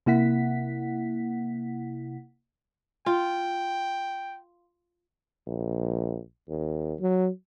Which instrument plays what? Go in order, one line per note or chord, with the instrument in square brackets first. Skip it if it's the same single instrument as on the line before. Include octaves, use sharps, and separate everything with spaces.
[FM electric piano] C3 A#3 E4 F#5 B6
[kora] F4 [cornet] G5
[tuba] A#1
D#2
F#3